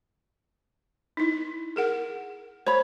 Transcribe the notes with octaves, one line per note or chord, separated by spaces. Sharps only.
D#4 E4
G#4 A#4 F#5
C5 C#5 B5